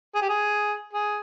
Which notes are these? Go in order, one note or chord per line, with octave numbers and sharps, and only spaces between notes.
G#4
G4
G#4
G#4